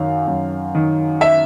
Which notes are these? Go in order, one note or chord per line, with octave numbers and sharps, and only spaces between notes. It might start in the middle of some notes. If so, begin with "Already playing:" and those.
Already playing: F#2 D#3 F5
F#2
D#3
E5